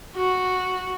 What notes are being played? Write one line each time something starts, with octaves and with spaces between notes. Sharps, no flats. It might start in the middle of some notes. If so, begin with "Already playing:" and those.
F#4